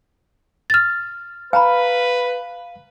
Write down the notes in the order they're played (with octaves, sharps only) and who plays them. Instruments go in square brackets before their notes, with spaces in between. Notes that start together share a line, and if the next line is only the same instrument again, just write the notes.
[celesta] F6 A6
[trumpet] B4 [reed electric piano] F5 [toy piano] G#5 A#5 B5